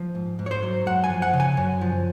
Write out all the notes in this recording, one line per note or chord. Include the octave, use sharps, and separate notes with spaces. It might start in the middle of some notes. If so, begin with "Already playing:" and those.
Already playing: F3
G#2
G#2
C#5
C5
F#3
F#2 F#5
G#5
F3
F#5
C#3
G#5
F#2
F3